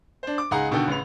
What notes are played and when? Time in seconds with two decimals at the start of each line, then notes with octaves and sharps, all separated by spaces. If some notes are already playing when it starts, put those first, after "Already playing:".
0.23 D4 C5
0.38 D6
0.51 C#2 D#4 G#4 F#5 A#5
0.71 B2 D3 D#3 F#4 A4 G5
0.87 A1 C#3 B4 F7